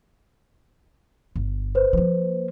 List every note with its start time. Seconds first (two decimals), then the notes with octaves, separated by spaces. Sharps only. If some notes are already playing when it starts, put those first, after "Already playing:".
1.36 G1
1.75 B4 C5
1.93 F3 A#3